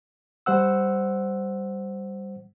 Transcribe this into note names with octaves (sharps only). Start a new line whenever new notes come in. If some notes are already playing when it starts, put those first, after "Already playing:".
G3 C5 F#5 E6